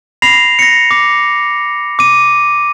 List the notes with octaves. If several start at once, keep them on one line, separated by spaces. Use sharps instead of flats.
B5 A#6 C7 F7
A#6 C#7
D6
D6 D#7